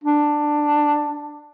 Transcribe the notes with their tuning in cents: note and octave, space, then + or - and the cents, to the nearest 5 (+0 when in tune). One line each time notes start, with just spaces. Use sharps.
D4 +10